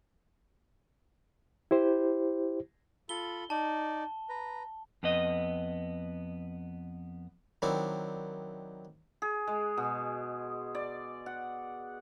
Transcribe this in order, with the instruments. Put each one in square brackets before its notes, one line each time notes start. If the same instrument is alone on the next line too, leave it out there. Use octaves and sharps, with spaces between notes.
[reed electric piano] E4 G4 C5
[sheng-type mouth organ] F4 A4 B5 [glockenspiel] G7
[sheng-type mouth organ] D#4 D5 [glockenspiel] A5
[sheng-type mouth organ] B4 A#5
[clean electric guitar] F2 B3 D#5
[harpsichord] D#3 F#3 C4 D4 E4
[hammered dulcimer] G#4
G#3
B2
D5
F#5